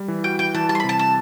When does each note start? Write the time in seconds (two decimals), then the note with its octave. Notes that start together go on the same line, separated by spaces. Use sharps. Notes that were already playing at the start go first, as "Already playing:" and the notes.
Already playing: G3
0.08 E3
0.24 F#4 G5
0.39 E3 G5
0.55 E3 A5
0.69 G3 A5
0.75 C6
0.80 B5
0.84 C3
0.89 A5
0.99 A5